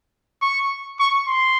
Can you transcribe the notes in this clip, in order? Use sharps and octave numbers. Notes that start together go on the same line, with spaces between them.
C#6
C#6
C6